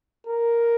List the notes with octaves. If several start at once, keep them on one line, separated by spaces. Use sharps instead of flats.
A#4